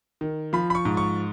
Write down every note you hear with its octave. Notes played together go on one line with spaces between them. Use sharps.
D#3
F3 B5
B5
C#6
G#2
C#6